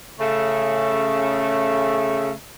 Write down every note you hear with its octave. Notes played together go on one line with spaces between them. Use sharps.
C#3 A3